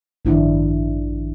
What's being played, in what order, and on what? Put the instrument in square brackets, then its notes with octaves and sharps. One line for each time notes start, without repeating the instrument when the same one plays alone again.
[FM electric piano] A1 G2 D#3 [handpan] F3 D4 E4